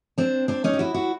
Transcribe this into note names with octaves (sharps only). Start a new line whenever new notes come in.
C4 D4
C4 D4
C#4 D#4
G4
E4 F#4
E4 F#4